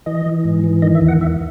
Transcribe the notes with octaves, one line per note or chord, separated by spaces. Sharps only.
E3 D#5
E3
G#2
E3
D#3 D#5
E5
E2
F#5
E2 E5